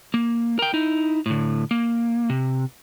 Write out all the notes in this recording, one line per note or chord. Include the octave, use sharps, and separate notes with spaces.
A#3
A#4 G5
D#4 E4
A2 D3
A#3
C3